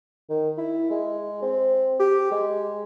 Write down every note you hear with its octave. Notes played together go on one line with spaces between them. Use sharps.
D#3
E4
G#3
C4
G4
G#3